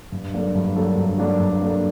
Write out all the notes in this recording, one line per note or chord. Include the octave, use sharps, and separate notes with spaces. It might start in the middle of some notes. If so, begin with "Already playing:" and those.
G2
F#3 A#3 D4 A4
G2
F#3 A#3 D4 A4
G2
F#3 A#3 D4 A4
G2
F#3 A#3 D4 A4